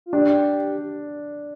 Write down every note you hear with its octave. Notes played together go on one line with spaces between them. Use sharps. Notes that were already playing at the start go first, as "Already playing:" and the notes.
F4
D4 G4